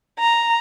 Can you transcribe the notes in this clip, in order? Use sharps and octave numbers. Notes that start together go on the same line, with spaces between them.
A#5